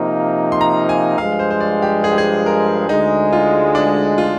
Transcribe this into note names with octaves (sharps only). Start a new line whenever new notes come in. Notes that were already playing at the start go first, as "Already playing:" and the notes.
Already playing: C3 F3 A#3 D#4
C6
A#5
G#5
G2 F3 G#3 F5
C5
C5
D5
G4
G#4
G4
G#4
A#4
D2 D3 G#3 D#4
F4
D4
F4